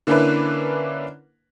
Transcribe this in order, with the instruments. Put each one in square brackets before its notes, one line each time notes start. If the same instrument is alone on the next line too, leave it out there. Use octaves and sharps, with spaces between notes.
[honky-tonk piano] D3 A#3 C#4 D4 E4 B4